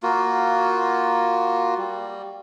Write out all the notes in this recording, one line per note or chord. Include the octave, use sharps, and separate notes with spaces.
A#3 F4 F#4
G3